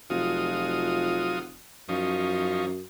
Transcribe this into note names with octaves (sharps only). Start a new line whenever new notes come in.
F1 F#3 F4 D#6
F#2 F3 C#4 D#4